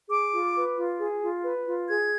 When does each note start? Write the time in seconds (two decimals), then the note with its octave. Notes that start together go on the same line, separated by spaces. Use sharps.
0.09 G#4 D6
0.32 F4
0.55 B4
0.77 F4
0.99 G#4
1.21 F4
1.43 B4
1.66 F4
1.88 G#4 G#6